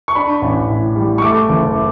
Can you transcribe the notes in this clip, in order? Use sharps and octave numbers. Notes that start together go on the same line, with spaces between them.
C#6
D4 B5
A1
A2
G3
C#6
A3 D6
F#1